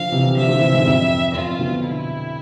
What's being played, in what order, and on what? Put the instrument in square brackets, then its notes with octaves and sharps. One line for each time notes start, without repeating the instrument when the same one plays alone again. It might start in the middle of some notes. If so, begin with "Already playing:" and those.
Already playing: [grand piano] D3 F3 [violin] F5
[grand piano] C3 E3
[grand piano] D3 F3 [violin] E5
[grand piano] D3 F3
C3 E3
G#2
F2
[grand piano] F2 [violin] F4
[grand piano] B2 D3
[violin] E4